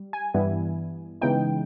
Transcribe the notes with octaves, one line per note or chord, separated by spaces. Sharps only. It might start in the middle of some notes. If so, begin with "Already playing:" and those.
Already playing: G3
G#5
G2 E3 G3 B3 E4
C#3 E3 G#3 B3 D#4 G5